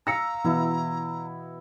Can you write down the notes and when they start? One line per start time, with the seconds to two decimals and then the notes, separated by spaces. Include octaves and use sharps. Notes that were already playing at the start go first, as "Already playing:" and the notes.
0.07 F5 A#5 E6 A#6 C#7
0.44 B2 E3 B3 E4